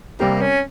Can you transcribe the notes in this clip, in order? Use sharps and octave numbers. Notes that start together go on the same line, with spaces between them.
C3 G3 A#3 C4 G4 A#4
C#4